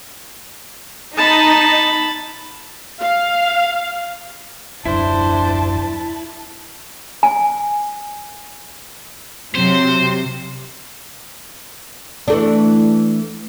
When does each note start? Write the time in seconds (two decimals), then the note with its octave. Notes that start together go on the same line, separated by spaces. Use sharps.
1.17 D#4 A5 B5
2.99 F5
4.86 D#1 F#2 D4 E4 C5 A5
7.23 G#5
9.54 C3 F#3 C5
12.28 E3 A3 D4